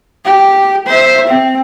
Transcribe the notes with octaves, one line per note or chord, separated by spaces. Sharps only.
G4
C5 E5
C4